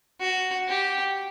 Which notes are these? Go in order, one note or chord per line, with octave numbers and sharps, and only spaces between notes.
F#4
G4